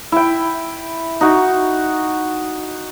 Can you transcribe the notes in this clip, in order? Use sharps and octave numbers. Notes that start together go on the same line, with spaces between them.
E4 G5
D#4 F#4